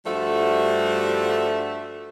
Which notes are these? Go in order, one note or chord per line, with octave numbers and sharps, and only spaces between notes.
G2 F3 G3 A3 F#4 E5